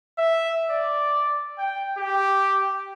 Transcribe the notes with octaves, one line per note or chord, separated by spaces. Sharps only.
E5
D5
G5
G4